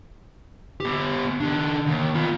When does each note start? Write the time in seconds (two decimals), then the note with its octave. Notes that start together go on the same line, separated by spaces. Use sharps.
0.80 B3 G4
1.40 D#3 D4
1.87 D#2
2.15 B3 F4